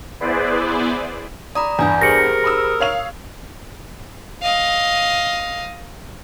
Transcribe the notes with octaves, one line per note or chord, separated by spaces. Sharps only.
B3 E4 G#4 B4 C5 D5
D5 A#5 B5 D#6
E2 G2 D5 G#5 G6
G4 G#4 A#4 C5 A#6 C#7
B5 D#6 E6
C#5 F5 F7
D#5 F5